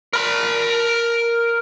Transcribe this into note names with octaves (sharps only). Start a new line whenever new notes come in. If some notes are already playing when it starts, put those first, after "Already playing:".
A#4 B5